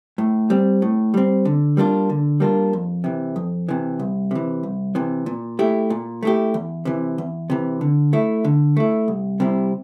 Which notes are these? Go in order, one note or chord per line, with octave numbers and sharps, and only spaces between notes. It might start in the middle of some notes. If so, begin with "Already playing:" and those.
A2
G3 C4
A2
G3 C4
D3
G3 A#3 D4 F4
D3
G3 A#3 D4 F4
F2
C3 E3
F2
C3 E3
C2
C3 E3
C2
C3 E3
A#2
A3 E4 G4
A#2
A3 E4 G4
E2
C3 E3
E2
C3 E3
D3
A3 E4
D3
A3 E4
C2
C3 G3 C4 E4